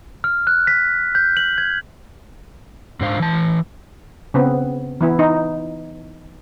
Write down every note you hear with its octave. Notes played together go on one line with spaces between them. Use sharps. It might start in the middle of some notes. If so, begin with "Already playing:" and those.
F6
F#6
B6
G6
F#7
G#6
G#2 D4 C5 F5
E3 A5
C#3 B3 C4
E3 B3 E4
D#4